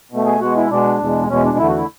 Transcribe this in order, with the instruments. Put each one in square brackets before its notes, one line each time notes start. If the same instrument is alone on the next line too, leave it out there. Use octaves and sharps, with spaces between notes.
[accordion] B2 A3
G#4
B2 G#3 F#4
E4
B2 G#3 D4
E2 B2 G#3
E2 B2 G#3 C#4
D4
E2 D3 A3 E4
F#4
E4